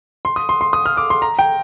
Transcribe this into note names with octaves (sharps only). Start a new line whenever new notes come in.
C6
D#6
C6
C6
D#6
F6
D6
C6
A#5
G5